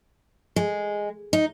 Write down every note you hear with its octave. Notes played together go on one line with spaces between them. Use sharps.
G#3
D#4